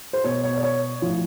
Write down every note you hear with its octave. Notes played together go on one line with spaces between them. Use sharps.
C5
B2 C#5
C#5
D5
C#5
A2 F3